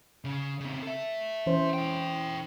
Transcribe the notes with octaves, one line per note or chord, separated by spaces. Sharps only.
C#3 C#4
C#3 C4
A4 E5
E3 C#4 C5
E4 G5